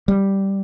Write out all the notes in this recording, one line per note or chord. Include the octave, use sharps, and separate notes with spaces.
G3